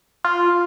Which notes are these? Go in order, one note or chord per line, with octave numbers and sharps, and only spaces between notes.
F4